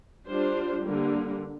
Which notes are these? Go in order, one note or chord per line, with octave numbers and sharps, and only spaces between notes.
G3 D4 F4 C5
D3 G3 A#3